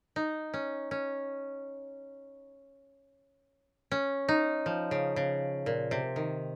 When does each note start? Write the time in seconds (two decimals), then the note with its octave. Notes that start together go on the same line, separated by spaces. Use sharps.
0.16 D#4
0.54 C#4
0.91 C#4
3.92 C#4
4.29 D#4
4.66 F3
4.91 C#3
5.16 C#3
5.66 A#2
5.91 C3
6.16 D#3